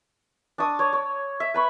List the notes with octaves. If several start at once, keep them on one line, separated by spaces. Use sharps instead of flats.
D4 D5 C#6 D#6
C#5 D5
C#5
E5
B4 B5 C#6